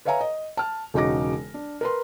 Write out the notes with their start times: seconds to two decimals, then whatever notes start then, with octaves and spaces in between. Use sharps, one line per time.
0.05 B4 C#5 E5 F5 G#5 A#5
0.21 D#5
0.57 A5 F6
0.94 E1 C#3 D#4 F#4 D6 A#6
1.54 D4
1.81 A#4 B4 C6